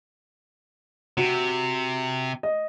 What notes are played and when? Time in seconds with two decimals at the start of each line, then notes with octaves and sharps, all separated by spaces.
1.17 C3 F#4
2.43 D#5